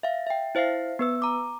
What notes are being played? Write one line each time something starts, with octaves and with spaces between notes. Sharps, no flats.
E5 F5
E5 G5
E4 C5 E5 F5 C7
B3 B4 E6
A#5 D6